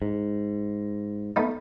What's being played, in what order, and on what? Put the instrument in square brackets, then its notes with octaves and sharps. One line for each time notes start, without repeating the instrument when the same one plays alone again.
[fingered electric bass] G#2
[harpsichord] A3 B3 D#4